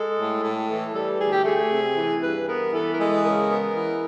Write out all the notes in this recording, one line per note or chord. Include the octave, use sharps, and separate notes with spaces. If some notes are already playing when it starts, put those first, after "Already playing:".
Already playing: G#3 A4
A2
A2
E3 A4
G3 A4
D2 G#4
G4
A3 G#4
C3
E3
G2 B4
B3 A#4
E3 A4
A#4
G#3 A4
C#3 A#4
B3
E3